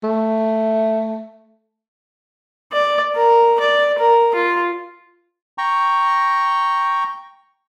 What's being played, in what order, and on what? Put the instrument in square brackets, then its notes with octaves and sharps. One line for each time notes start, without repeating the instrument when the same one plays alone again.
[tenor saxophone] A3
[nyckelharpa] D5
A#4
D5
A#4
F4
[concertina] G5 A#5 C#6